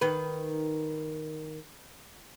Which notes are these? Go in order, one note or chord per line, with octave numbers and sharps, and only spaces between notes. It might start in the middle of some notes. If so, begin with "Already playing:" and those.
D#3 B4